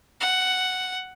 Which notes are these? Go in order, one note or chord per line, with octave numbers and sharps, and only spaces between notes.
F#5